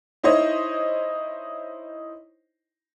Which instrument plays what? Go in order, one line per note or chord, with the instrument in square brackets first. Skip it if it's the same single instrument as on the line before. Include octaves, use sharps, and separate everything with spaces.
[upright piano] D#4 E4 C5 C#5 D#5